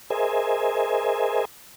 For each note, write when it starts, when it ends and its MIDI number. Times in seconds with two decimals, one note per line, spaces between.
0.10 1.45 68
0.10 1.45 70
0.10 1.45 72
0.10 1.45 75
0.10 1.45 76
0.10 1.45 80